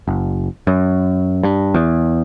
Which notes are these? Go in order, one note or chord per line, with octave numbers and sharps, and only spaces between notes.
F#1
F#2
G2
E2